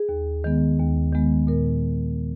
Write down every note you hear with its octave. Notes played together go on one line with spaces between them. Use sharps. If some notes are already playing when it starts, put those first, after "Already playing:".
Already playing: G#4
D#2
D#3 G#3 B3
D#2
D#3 G#3 B3
A#2 A#4